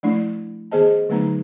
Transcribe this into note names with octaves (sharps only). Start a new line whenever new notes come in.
F3 A3 D4 E4
D#3 B3 G#4 C5 D#5 A5
D3 F#3 A3 B3 D#4 A#5